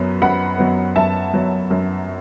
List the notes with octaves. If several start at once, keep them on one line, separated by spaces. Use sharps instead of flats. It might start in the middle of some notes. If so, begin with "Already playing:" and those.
Already playing: F#2 F#3 B3
F#2 F#5 B5
F#3 B3
F#2 E5 A5
F#3 B3
F#2